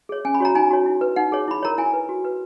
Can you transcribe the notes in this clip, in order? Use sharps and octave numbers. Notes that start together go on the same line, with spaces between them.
G#4 C#5
C#4 G#5
B5
F#4 C#5 A#5
D#4 G#5
F#4 C#5
E4
B4
D#4 F#5
G#4 C#5
E4 B5
A#4 C#5 A#5
E4 G#5
B4
F#4
B4